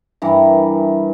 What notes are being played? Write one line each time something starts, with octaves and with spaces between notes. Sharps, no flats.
G2 E3 A#4